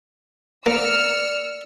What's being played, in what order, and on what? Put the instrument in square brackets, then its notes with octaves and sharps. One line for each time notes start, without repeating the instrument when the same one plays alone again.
[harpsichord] A#3 [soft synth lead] D5 [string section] E6 F6 C#7